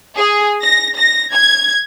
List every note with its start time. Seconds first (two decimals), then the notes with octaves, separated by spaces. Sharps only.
0.17 G#4
0.62 A#6
0.97 A#6
1.33 G#6